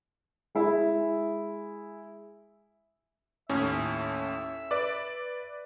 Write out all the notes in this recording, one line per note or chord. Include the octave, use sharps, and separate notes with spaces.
G#3 E4
D#2 A2 C#4 E5
B4 D5 D6